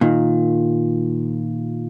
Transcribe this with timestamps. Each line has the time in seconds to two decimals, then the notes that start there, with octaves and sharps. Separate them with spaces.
0.01 A#2 D#3